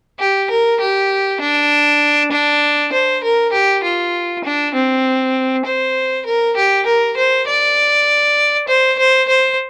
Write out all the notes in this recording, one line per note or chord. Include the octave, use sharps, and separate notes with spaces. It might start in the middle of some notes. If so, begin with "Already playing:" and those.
G4
A#4
G4
D4
D4
C5
A#4
G4
F4
D4
C4
C5
A#4
G4
A#4
C5
D5
C5
C5
C5